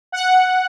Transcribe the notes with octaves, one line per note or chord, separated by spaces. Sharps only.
F#5